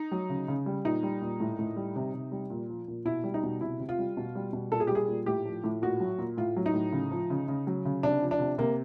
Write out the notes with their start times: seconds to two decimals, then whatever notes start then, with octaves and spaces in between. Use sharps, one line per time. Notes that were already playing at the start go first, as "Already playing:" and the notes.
Already playing: D#4
0.12 F#3
0.29 C#3
0.48 C#3
0.66 G3
0.85 A#2 D#4
1.03 G3
1.22 A#2
1.40 A2
1.59 A2
1.77 G3
1.96 C3
2.13 C3
2.32 G3
2.50 A#2
2.69 F3
2.88 A#2
3.05 B2 E4
3.24 G3
3.34 D#4
3.43 B2
3.61 C3 E4
3.80 C3
3.89 F4
3.99 G3
4.17 B2
4.35 G3
4.53 B2
4.72 A#2 A4
4.80 G#4
4.87 G4
4.91 G3 G#4
5.08 A#2
5.26 A2 G4
5.45 F3
5.64 A2
5.82 A#2 F#4
6.00 F#3
6.18 A#2
6.37 A2 F4
6.56 F#3
6.66 D#4
6.74 A2
6.92 C#3
7.11 F3
7.30 C#3
7.48 C#3
7.67 F#3
7.85 C#3
8.03 C3 D4
8.21 F3
8.31 D4
8.39 C3
8.58 C3 A#3